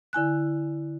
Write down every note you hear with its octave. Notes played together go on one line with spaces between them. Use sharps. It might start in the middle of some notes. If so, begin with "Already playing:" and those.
D3 E4 G#5 F#6